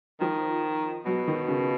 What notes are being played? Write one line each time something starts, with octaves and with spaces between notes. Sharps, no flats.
D#3 F3
B2 F#3
D#3
C#3